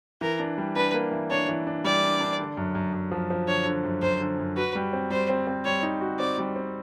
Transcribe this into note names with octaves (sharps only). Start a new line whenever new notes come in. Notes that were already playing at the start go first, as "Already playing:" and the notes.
E3 A#4
D4
G3
D4 B4
A#3
E3
D4 C#5
E3
D4
G3 D5
D4
D4
D3
F#2
F#2
F#2
F3
F3
D3 C#5
D3
F#2
F#2 C5
D3
F#2
F#4 B4
G3
C4
G3 C5
C4
C4
G3 C#5
D#4
F#4
C4 D5
G3
C4